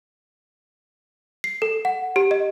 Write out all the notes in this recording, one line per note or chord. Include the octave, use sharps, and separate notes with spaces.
C7
A4
F#5
G4
D#5